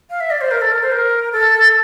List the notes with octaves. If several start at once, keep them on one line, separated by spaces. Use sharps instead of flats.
F5
E5
D5
C5
A#4
A4
A#4
C5
A#4
A4